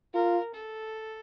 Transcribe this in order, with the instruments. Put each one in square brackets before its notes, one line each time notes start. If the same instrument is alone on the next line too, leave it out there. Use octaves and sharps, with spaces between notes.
[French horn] F4 [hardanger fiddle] A#4
[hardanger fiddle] A4